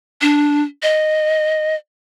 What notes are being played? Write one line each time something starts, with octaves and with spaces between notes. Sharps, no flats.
D4
D#5